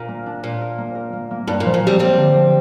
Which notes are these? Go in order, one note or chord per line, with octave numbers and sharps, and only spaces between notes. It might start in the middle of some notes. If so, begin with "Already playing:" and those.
Already playing: A#2 D4 A#4
A#3
D4
A#2 A#4
A#4
A#3
A#4
A#3
A#3
G2 A#3
A#2
F3
A#2
F3 G3 C4
G3 A#3 C4
D3
F3